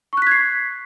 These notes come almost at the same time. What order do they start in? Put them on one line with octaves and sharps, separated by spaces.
C#6 F#6 B6 G#6 C7